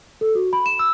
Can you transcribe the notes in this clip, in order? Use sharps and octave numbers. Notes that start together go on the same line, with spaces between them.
A4
F#4
B5
E7
E6